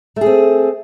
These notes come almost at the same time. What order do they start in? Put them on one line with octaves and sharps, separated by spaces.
A3 G#4 C4